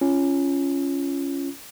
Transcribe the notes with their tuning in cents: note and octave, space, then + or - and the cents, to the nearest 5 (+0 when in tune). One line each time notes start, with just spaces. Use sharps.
C#4 +0 F4 -25